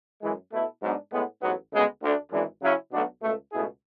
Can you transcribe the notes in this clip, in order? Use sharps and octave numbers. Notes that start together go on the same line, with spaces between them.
F#2 E3 G#3
B2 A3 E4 A4
G#2 F#3 B3 D4
A2 G#3 B3
A1 G#2 F#3 B3
D2 C#3 G#3 B3
D2 D3 A3 D4
G#1 F#2 E3 G#3 D4
C#3 F#3 C#4 E4
B1 B2 A3 D4 F#4
C#2 B2 A3
C#2 B2 A3 E4 G#4